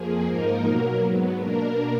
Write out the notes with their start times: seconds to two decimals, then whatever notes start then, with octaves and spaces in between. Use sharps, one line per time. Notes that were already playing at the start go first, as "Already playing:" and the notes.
Already playing: F2 F3 A#3 G#4
0.27 G#2 F3 A#3 D#4 A#4
0.65 B2 F#3 A#3 A#4
1.02 G#2 F#3 B3
1.39 B2 A#3 D4 A#4